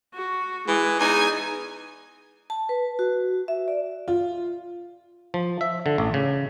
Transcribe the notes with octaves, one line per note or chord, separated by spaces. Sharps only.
F#4
E3 G#3 G#4
E2 D#4 G#5
A5
B4
F#4
E5
D5
F4
F3
E5
D3
A1
C#3